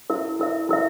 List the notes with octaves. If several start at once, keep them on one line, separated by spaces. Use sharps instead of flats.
E4 A#4 E5
E4 A#4 E5
E4 A#4 E5